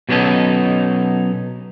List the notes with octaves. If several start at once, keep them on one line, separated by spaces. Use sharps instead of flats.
B2 F#3 B3 C#4 D#4 A4